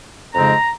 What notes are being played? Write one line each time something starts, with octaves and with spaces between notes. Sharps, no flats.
F2 C#3 G#3 C4 D#4 A#5